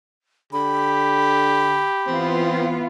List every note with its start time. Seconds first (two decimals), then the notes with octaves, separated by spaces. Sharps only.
0.53 D3 G4 B5
2.07 E3 B3 C4 F4